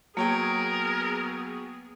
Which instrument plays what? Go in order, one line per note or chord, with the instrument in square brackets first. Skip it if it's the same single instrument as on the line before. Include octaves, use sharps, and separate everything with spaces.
[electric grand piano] F#3 C#5 G5 [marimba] A#3 [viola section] B3 G#4 [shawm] A#4